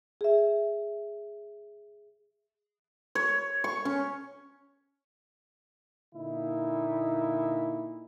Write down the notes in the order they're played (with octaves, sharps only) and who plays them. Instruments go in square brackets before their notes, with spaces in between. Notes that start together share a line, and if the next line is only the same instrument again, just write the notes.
[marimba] G#4 E5
[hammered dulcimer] C#5
C#6
C#4
[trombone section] A#2 D3 D#4 E4